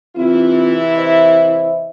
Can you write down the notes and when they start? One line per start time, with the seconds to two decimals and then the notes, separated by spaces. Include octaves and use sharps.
0.16 C3 E3 C4 E4 F4
0.94 C5 D#5 E5